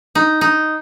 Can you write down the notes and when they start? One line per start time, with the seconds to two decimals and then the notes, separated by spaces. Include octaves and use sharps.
0.15 D#4
0.41 D#4